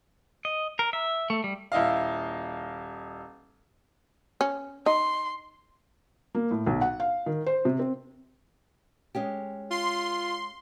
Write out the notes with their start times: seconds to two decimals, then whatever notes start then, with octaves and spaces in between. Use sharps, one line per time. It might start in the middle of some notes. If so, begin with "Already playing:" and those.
0.45 D#5
0.79 A#4
0.93 E5
1.30 A3
1.44 G3
1.72 D#1 E4 D#5 F5
4.41 C#4
4.86 D#4 C6
6.35 A#3
6.51 A2
6.67 B1
6.81 F#5
7.00 F5
7.26 D#3
7.46 C5
7.65 C3
7.79 C4
9.15 G#3 C#4 G4
9.71 F4 C6